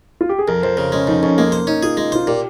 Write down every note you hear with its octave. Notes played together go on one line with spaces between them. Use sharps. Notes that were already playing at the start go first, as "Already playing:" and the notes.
F4
G4
G#4
F2 A#4
F2 C5
C#3 A#4
G#3 C#4
F2 D#4
F2 C#4
G#3 A#3
C5
C#4 D#4
F4 G#4
G#3
F4 C5
A#2 G4